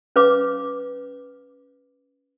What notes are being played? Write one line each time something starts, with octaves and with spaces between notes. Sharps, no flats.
C#4 B4 F5 D6